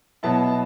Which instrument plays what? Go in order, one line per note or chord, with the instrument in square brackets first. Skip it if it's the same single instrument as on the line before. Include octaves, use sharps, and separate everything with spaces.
[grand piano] B2 F#3 B3 E4 A5